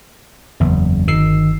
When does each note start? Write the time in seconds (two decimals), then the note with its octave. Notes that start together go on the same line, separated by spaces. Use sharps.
0.60 F#1 E2
1.08 G1 D#3 E6 C7